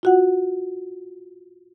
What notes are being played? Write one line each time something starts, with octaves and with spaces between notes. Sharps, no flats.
F4 F#4 F#5